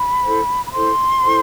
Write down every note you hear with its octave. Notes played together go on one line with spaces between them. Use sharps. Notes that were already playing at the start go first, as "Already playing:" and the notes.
Already playing: B5
E4 A4 C5
B5
E4 A4 C5 C6
E4 A4 C5